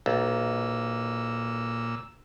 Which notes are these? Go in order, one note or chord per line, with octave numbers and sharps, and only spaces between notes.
B1 A#2 E6